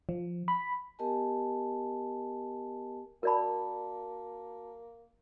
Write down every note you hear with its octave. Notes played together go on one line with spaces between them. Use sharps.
F3
B5
B3 G4 A#4 D#5 G#5 A5
A#3 F#4 A#4 D5 A5 B5